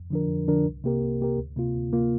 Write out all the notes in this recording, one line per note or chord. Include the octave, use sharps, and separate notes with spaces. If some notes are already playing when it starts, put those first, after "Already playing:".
Already playing: F2
D3 F3 D4 A#4
F2
D3 F3 D4 A#4
C2
C3 A#3 G4 A#4
C2
C3 A#3 G4 A#4
D2
C3 A#3 F4
D2
C3 A#3 F4